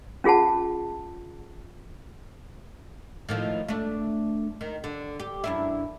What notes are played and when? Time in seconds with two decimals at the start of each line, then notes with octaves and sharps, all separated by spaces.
0.24 C#4 F4 G#4 F#5 A5
3.29 A2 D#3 F3
3.69 A3 D4
4.61 D#3
4.84 D3
5.20 G4
5.44 F#2 D4 E4